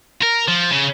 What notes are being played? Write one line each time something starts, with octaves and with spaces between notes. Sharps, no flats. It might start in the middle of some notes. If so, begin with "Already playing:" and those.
A#4
F3
C#3